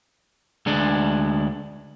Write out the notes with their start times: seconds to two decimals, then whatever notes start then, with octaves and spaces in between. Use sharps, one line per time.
0.66 D2 G#3 D4